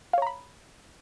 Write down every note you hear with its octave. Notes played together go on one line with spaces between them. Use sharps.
C#5 F5 A#5 B5